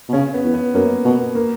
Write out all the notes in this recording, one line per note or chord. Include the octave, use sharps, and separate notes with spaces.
B2
C#3 C#4
B3
E2
B3
F#2 A#3
B2 B3
A#3